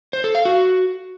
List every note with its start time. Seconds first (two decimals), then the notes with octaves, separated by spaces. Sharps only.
0.13 C5
0.24 A4
0.35 F5
0.45 F#4